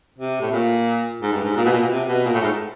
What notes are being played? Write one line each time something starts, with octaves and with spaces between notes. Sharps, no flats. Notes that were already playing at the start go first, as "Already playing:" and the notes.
C3
A2
A#2
G#2
G2
G#2
A#2
B2
A#2
B2
C3
B2
A#2
A2
G#2